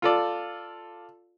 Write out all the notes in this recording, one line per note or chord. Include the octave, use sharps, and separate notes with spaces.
F4 A4 D5